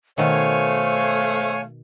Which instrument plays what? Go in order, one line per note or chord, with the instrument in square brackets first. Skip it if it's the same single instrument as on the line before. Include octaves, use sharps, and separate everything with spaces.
[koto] B2 D#3 [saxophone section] A3 F5 [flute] C5 [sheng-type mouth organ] C#5 G#5